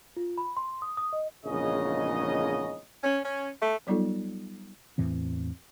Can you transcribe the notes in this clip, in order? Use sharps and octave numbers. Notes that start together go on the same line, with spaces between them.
F4
B5
C6
D#6
D#6
D#5
A#1 E2 G#2 C#3 C#5 D#5
C#4
C#4
A3
F#3 G3 B3 D#4 F4 A4
E2 A2 E3 C4